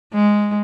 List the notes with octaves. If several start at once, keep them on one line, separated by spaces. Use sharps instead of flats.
G#3